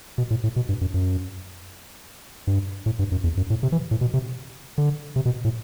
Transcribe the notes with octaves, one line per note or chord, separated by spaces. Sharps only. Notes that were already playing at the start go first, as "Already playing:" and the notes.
B2
A2
A2
B2
G2
F#2
F#2
G2
A2
G2
F#2
E2
F#2
A2
C3
E3
A2
B2
C3
D3
C3
B2
A2